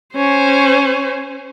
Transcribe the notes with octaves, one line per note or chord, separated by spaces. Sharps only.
C#4 C5